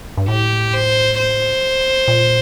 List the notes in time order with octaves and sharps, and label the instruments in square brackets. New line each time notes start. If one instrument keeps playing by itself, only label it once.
[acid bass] G2
[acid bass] A2 [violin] G4
[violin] C5
C5
[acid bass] A#2